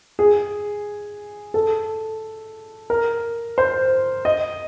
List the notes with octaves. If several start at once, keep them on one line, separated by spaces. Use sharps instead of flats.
G#4
A4
A#4
C5
D#5